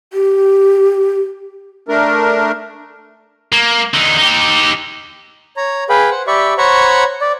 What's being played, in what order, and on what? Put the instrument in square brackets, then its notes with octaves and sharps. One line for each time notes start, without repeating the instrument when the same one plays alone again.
[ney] G4
[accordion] A3 D4 A#4
[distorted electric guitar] A#3
D3 D#4
D#4 G4
[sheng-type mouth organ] C#5 A#5
G#4 B4 F5 G5 B5
C5 F#5
G4 D5 E5 B5 C#6
C5 C#5 F#5 A#5 B5 C#6
D5